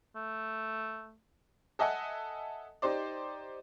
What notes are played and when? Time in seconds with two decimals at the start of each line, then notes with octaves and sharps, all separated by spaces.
0.16 A3
1.79 A4 D#5 E5 F#5 G#5
2.82 D#4 G4 C5 D5